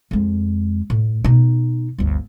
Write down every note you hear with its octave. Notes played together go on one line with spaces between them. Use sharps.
F2 G#3
A2
B2 D#4
G1 D2